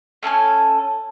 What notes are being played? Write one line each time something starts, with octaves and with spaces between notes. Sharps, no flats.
A3 C#4 A4 G#5